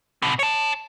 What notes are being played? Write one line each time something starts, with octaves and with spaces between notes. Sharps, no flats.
B2 D3
C#5 A5